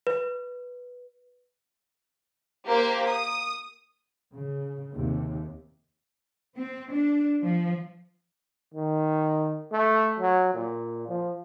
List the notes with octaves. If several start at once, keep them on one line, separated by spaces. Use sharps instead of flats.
B4
A#3 G4 C5
D#6
C#3
D#2 C3
C4
D4
F3
D#3
A3
F#3
A#2
F3